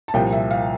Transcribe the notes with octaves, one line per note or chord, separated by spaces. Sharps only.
A5
C2 A#2 F3 G5
E5
F5